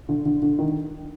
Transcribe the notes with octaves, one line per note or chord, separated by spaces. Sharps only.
D3
D3
D3
D#3